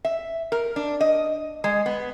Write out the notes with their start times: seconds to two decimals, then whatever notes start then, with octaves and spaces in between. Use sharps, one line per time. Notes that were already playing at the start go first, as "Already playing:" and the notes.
0.05 E5
0.52 A#4
0.76 D4
1.01 D#5
1.64 G#3
1.86 B3